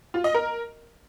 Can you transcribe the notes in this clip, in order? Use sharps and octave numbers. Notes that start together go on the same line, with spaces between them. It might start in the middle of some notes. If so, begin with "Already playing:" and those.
F4
D#5
A#4